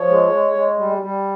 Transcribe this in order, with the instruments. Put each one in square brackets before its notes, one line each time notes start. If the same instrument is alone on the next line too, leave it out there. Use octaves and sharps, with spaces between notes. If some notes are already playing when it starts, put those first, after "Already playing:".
Already playing: [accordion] F3 C#5
G#3
G#3
G#3
G3
G3